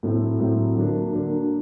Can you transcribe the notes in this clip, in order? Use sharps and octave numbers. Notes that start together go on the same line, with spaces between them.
A2 F#3 A3 C4
A2 F#3 A3 C4
D3 F#3 A#3 D4
D3 F#3 A#3 D4